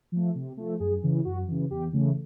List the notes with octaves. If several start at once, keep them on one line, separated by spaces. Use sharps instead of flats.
F3 A3
C3
F3 A3
F#2 G#4
C#3 E3
F#2 F#4
C#3 E3
E2 G4
C#3 E3 A3